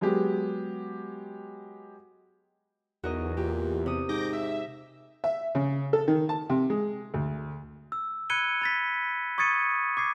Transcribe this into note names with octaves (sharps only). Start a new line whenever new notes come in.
F#3 G#3 B3 G4
B1 E2 F#4 A#4 D#5
A#2 G4
C3 D#6
G#2 D6 G6 A#6
E5
E5
C#3
A4
D#3
A5
C3
G#3
D2
E6
B5 F#6 G#6 C#7 D#7 G7
B5 A6 B6
C#6 D#6 G#6 A6 C#7 D#7
D6 G#6 C7